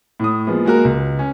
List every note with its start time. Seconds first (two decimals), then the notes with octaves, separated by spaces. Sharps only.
0.20 A2 D#6
0.47 F3 G#3 A#3 B3
0.65 G#3 A#3 F#4 A#4
0.85 C#2
1.19 C#4